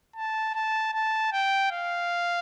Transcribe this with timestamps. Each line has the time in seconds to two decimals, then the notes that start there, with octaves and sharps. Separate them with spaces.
0.16 A5
0.55 A5
0.94 A5
1.33 G5
1.71 F5